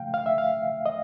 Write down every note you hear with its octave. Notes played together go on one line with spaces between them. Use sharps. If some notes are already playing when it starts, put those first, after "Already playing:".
Already playing: C#3 F3 A3 F5 G5
F5
E5
F5
D#5